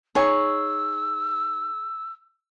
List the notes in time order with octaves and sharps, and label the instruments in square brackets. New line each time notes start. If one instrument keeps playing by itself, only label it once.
[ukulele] D#4 C#5 G#5 [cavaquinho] G#4 C#6 [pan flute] E6